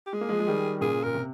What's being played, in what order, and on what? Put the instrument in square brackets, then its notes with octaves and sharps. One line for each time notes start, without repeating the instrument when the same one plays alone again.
[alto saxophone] G4
[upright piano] G#3 [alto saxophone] G#4
[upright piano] A#3
F3 G#3
G#3
D#3 G3
[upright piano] A#2 C#3 [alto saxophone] G#4
[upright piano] A#2 [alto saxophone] A#4
[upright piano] C3